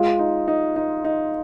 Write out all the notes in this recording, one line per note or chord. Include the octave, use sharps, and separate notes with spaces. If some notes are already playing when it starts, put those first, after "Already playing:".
Already playing: G#3 F4
D#4
D#4
D#4
D#4